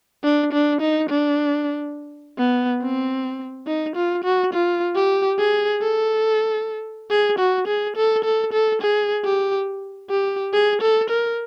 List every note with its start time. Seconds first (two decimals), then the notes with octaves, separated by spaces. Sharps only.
0.24 D4
0.53 D4
0.81 D#4
1.10 D4
2.38 B3
2.82 C4
3.67 D#4
3.96 F4
4.24 F#4
4.53 F4
4.96 G4
5.39 G#4
5.82 A4
7.10 G#4
7.39 F#4
7.68 G#4
7.96 A4
8.25 A4
8.53 A4
8.82 G#4
9.25 G4
10.10 G4
10.53 G#4
10.82 A4
11.10 A#4